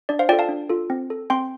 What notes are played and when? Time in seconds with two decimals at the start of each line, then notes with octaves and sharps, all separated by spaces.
0.09 D4 D5
0.19 C5 F5
0.29 F4 D5 G5
0.32 A4
0.39 F5 A5
0.49 D4
0.69 F4 A4
0.90 C4
1.10 A4
1.30 C4 G5 C6